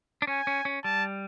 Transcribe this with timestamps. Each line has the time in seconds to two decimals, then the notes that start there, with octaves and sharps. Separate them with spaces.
0.22 D4
0.27 C#4 G#5
0.47 C#4
0.65 C#4
0.84 G3 A5